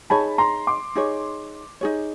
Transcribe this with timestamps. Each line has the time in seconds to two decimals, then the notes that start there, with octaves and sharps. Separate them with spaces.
0.10 D#4 G#4 C#5 A5 B5
0.38 A#5 C6
0.67 C6 D6
0.95 D#4 G#4 C#5
1.81 D#4 G#4 C#5